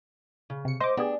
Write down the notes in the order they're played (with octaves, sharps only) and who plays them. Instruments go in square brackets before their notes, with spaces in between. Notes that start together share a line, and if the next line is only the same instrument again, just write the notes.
[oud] C#3
[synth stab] C3 C#7
[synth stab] C5 D6 [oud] D#5
[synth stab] B3 G4 G#4 [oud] D4